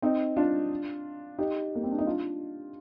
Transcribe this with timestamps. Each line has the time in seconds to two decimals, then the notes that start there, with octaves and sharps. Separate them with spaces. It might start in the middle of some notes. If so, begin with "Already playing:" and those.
0.02 C4 D#4
0.37 D4 F4
1.38 D#4 G4
1.75 A#3
1.84 C4
1.91 D4
1.98 D#4
2.06 D4 F4